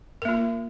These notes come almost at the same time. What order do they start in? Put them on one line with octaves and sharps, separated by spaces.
A#4 A#3 F4